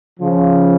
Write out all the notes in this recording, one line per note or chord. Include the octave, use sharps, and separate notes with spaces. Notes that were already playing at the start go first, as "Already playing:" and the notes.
C#3 F3